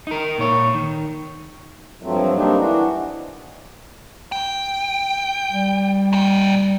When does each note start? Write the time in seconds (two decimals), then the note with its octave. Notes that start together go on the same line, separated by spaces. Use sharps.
0.07 D#4 A#4
0.38 A#2 C#5
0.74 D#3
2.03 G2 F3 F#3 A3 C4
2.35 G3 A#3 C4 D4 D#4
2.56 E3 D4 F#4
4.32 G5
5.51 G3
6.13 A#2 G5